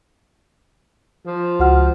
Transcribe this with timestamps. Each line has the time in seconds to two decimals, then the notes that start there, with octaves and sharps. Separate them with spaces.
1.26 F3
1.59 C#2 F#4 F#5 F6